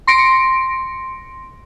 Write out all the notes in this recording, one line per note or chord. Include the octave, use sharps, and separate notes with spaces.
C6 A#6 C#7 D7